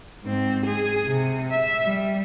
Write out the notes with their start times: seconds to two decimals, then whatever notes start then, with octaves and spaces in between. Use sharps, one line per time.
0.23 G#2 C4
0.66 G#4
1.07 C3
1.51 E5
1.84 G3